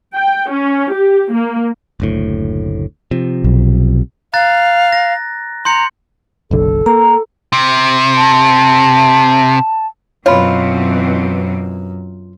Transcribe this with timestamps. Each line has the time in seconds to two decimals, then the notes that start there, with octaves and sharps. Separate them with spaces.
0.14 G5
0.52 C#4
0.94 G4
1.34 A#3
2.00 F#1 D2 A2
3.11 C3 F3
3.44 B1
4.34 F5 A#5 F#6 A6
4.92 A#6
5.65 A#5 C6 G6 C#7
6.51 F#1 B1 D3 A4
6.86 A#3 A#5
7.52 C3
8.17 A5
10.26 F#2 B2 E3 C4 F4 C#5 B5